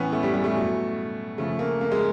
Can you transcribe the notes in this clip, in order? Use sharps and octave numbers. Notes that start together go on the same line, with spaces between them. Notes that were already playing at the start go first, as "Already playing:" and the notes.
Already playing: A2 E3 B3 C#4
A3
G3
G3
A3
B2 F#3
C#3 F3 A3
A#3
A#3
G#3